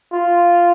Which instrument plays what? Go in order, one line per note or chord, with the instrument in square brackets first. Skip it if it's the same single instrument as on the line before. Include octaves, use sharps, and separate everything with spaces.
[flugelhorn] F4